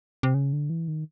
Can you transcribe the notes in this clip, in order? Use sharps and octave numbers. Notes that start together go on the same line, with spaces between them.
C3
C#3
D3
E3
D#3